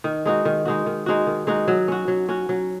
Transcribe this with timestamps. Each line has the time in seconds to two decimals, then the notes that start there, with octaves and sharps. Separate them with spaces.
0.04 D#3
0.26 G#3 D#4 F#4
0.45 D#3
0.65 G#3 D#4 F#4
0.86 D#3
1.06 G#3 D#4 F#4
1.27 D#3
1.47 G#3 D#4 F#4
1.68 F#3
1.88 C#4 F#4
2.08 F#3
2.29 C#4 F#4
2.49 F#3